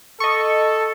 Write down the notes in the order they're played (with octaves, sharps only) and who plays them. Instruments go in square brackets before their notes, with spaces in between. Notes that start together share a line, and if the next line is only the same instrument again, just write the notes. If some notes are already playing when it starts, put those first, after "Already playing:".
[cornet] A4 [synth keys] D#5 C#6